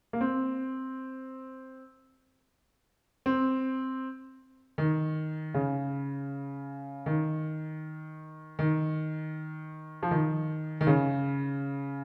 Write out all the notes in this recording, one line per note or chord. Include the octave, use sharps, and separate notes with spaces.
A#3
C4
C4
D#3
C#3
D#3
D#3
F3
D#3
D#3
C#3